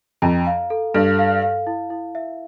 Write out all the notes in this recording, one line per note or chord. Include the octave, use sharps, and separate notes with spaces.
F2 A#5
F5
A4
G2 A4
F5
F5
E4
E4
E5